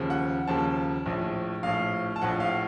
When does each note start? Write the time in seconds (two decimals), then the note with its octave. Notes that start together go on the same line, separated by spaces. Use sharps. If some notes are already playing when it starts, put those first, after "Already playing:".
Already playing: D#2 C#3 F3
0.10 F#5
0.47 D#2 C#3 F3 A5
1.06 A#1 A2 F3
1.63 A#1 A2 F3 F5
2.16 A5
2.22 A#1 A2 F3 F#5
2.40 F5